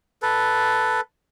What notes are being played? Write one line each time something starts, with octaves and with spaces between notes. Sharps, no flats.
A4 B4